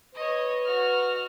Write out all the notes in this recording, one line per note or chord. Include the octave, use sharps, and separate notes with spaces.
B4 C#5 D#5
F#4 F6